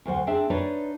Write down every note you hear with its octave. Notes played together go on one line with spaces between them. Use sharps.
D2 F#3 C5 F#5
C4 D4 G#4 E5
D4 D#4 B4 C#5 D5